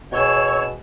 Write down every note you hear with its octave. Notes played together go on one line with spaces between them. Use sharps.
B2 G#4 C#5 E6